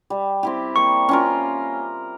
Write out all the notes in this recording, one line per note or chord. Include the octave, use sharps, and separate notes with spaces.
G3
C4 E4 G4
A#3 C#6
C#4 F4 A#4